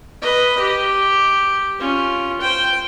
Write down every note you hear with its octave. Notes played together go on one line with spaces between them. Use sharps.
B4 D#5
G4
C#4 F4
C5 G5